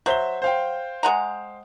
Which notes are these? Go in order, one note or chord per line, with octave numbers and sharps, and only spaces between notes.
F#3 C5 E5 G7
C5 F5 G5
G#3 F#5 A#5